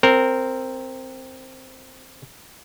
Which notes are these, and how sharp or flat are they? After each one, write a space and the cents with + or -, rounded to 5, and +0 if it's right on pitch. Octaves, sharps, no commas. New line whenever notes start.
C4 +0 A#4 -10